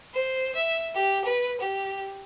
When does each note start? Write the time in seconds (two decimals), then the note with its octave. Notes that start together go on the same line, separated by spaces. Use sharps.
0.13 C5
0.55 E5
0.94 G4
1.25 B4
1.60 G4